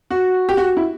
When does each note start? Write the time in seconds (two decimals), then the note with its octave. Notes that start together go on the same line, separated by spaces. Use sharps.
0.11 F#4
0.49 G4
0.57 F#4
0.77 E4